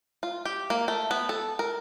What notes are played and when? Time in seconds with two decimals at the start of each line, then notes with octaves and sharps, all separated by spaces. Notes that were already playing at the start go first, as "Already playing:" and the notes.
0.23 F4
0.45 G4
0.70 A#3
0.88 A3
1.11 B3
1.29 A4
1.59 A#4